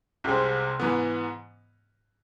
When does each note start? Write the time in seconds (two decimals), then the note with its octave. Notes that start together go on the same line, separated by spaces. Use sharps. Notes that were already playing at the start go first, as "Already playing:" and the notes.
0.24 C2 C3 G#3 C4
0.80 G#2 E3 B3